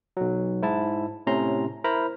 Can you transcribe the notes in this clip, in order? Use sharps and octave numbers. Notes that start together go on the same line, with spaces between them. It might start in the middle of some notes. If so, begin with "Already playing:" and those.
B1 F#3
G#2 E4 A5
A2 C3 C#4 A#5 C6
E4 A#4 C5 A#5 B5